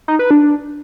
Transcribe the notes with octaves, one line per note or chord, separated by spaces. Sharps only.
D#4
B4
D4